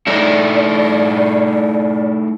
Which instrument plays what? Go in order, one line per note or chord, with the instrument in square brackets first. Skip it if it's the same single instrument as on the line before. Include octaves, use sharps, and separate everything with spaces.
[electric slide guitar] A3 D#4 E4 [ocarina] D5